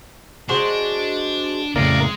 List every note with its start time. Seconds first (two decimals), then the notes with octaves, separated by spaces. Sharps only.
0.49 G#3 D4 F#4 C5
1.76 F2 A2 C#3 G#3 A#3 A#4 D5